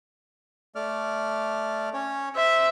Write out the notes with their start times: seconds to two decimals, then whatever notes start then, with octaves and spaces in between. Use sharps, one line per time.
0.75 A3 D5 F6
1.94 C#4 C#5
2.35 C5 E5